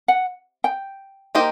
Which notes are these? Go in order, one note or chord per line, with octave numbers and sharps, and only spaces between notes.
F#5
G5
A#3 D#4 G4 C5 D#5